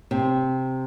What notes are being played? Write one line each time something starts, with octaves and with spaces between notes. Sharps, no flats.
C3